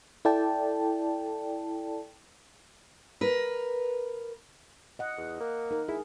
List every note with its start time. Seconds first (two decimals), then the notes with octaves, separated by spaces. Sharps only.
0.25 E4 A4 D5 G5 A5
3.21 A#4 B4
4.99 D#5 F#5
5.17 E2
5.40 A#3
5.71 D#4 A#4
5.88 E4 G#4